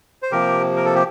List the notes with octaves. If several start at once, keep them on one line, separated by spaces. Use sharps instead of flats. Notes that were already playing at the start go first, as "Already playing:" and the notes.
C5
C3 F3 A#3 G4 A#4
A#4
A4
G4